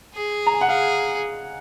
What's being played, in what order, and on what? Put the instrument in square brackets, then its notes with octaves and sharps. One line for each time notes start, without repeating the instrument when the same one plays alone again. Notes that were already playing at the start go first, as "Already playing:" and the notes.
[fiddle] G#4
[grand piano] A#5
G#5
F#5
[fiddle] G#4 [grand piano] F5